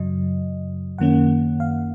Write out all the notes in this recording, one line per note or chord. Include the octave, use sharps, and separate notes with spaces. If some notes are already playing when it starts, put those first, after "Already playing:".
Already playing: F#2 C#3 F#3 D#5
F#2 D#3 A#3 C#4 F#5
F5